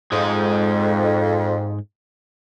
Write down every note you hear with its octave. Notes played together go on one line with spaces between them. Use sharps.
F2 G#2 G#3